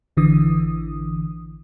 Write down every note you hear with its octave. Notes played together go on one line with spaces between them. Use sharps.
A1 D3 E3 D#6